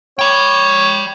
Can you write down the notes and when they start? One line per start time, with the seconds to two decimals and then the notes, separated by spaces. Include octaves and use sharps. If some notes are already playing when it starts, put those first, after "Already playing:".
0.19 C#5 G5 B5